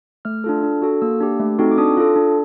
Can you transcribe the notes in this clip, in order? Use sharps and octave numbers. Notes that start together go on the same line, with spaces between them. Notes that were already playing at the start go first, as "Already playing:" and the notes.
A3 F6
D4 F4 A4
D4
F#4 A4
A#3 E6
D4 G4
A3
C4 D#4 F#4 A4
D6
D4 D#6
F4 A4
D4